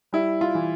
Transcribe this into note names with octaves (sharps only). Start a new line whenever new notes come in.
G3 E4
F4
E3